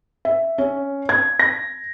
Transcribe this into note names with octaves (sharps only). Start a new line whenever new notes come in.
E5
C#4
G#6
A#6